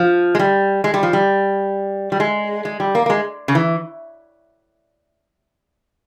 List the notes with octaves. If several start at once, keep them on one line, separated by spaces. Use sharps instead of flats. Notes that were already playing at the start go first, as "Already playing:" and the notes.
Already playing: F3
G#3
G3
G#3
G3
F3
G3
G3
G#3
G#3
G3
A#3
A#3
G#3
C#3
E3